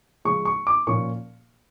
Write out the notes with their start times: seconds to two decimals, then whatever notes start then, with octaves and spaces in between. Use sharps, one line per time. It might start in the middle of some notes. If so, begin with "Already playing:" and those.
0.25 C#3 F3 G#3 C#4 C#6
0.45 C#6
0.67 D6
0.87 A#2 F3 A#3 C#4 C#6